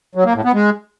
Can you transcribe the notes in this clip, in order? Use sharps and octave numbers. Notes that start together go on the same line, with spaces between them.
F#3
A#3
A2
B3
G#3